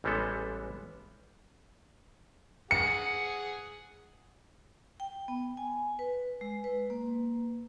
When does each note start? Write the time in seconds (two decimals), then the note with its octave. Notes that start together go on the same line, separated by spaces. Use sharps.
0.04 A1 E3 G3 G#3 B3 A4
2.71 G#4 F#5 C#7
5.00 G5
5.28 B3
5.57 G#5
5.99 B4
6.41 G#3
6.64 B4
6.90 A#3